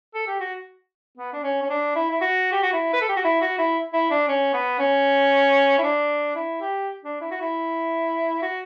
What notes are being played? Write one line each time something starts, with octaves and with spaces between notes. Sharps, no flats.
A4
G4
F#4
B3
D4
C#4
C#4
D4
E4
E4
F#4
G4
F#4
E4
B4
A4
G4
F#4
E4
F#4
E4
E4
D4
C#4
B3
C#4
E4
D4
E4
G4
D4
E4
F#4
E4
F#4